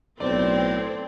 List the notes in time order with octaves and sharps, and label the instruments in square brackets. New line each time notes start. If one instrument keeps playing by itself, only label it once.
[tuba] B1 [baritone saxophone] A2 [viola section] C4 [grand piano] D5